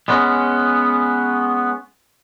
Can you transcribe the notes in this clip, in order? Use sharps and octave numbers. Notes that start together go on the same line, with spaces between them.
G#3 B3 C#4